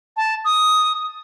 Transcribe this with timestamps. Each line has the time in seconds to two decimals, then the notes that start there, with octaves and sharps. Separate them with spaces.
0.17 A5
0.45 D#6